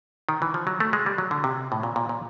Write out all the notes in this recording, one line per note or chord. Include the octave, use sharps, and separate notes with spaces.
D#3
E3
F3
F#3
A3
G#3
G3
F#3
D3
C3
A2
A#2
A#2
A#2